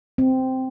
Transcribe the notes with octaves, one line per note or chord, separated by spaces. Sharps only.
C4